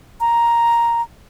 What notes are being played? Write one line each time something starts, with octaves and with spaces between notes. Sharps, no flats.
A#5